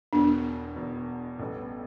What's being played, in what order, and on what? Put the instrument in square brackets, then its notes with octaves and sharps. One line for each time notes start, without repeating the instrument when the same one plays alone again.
[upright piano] E1 E2 B2 [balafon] D4
[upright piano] E1 E2 B2
A1 A2 G3 B3